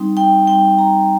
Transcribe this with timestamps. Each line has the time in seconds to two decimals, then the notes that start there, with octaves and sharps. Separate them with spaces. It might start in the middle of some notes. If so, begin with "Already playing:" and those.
Already playing: G3 C4 D#4
0.17 G5
0.47 G3 C4 D#4 G5
0.79 A#5